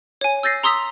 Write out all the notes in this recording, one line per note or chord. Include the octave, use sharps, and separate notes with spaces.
C#5 G#5
E6 G6 A6 A#6 C7
A#5 C6 D#6 E6 B6 F7